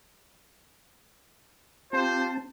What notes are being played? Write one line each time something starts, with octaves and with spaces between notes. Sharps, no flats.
C4 F4 G4 C5 A5